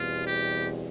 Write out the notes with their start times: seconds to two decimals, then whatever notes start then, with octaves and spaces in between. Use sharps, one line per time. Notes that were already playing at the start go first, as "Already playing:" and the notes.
Already playing: E2 B2 G3 C4 F4
0.27 G4